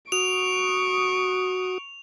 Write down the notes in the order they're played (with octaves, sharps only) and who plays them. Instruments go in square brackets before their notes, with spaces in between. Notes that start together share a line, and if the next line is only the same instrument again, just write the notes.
[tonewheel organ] F#4 D#6 [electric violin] C#6 D7 [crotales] F7